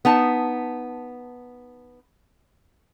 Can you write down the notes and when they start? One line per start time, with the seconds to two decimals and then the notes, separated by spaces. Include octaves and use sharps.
0.05 B3 D#4 A5